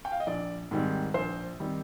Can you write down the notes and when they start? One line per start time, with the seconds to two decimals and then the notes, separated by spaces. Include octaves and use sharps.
0.05 G5
0.12 F5
0.20 D#5
0.27 A#1 D5
0.71 G#2 D#3 G3 C4
1.14 A#1 C5
1.60 D#3 G3 C4